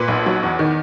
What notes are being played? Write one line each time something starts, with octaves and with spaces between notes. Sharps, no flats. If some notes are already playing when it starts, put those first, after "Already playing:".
Already playing: A#2 B4
B1
F#3
E2
D#3